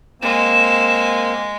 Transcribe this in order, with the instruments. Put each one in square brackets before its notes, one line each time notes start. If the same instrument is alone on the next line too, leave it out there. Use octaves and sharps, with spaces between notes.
[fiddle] G#3 [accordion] A#3 C4 [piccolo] E7